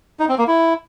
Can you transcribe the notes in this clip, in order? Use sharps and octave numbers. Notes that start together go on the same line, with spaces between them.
D#4
C4
A#3
E4